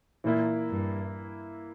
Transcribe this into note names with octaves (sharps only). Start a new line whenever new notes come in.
A#2 E3 A#3 E4
G2